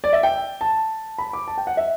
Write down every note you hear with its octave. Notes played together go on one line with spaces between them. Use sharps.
D5
E5
G5
A5
B5
D6
A5
G5
F#5
E5